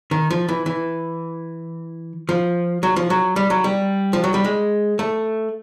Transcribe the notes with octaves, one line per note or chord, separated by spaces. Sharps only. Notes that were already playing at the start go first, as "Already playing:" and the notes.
D#3
F3
E3
E3
F3
F#3
F3
F#3
G3
F#3
G3
F3
F#3
G3
G#3
A3